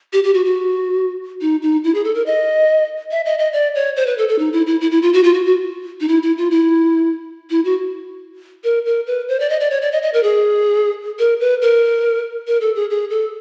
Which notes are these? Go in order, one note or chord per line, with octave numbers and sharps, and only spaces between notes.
G4
G4
F#4
F#4
D#4
D#4
E4
G#4
A4
A#4
D#5
E5
D#5
D#5
D5
C#5
C5
B4
A4
A4
D#4
E4
E4
E4
E4
F4
F#4
F4
F#4
F#4
D#4
E4
E4
F4
E4
E4
F#4
A#4
A#4
B4
C5
D5
D#5
D5
C#5
D5
D#5
D#5
A#4
G#4
A#4
B4
A#4
A#4
A4
G#4
G#4
A4